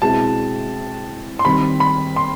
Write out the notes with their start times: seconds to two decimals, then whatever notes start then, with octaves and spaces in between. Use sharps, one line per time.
0.01 B2 G#3 C4 E4 A5
1.39 C6
1.45 D#3 G3 C4 B5
1.80 B5
2.16 C6